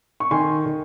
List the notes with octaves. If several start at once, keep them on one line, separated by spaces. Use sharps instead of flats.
C#6
D#3 G#5 C6
D#3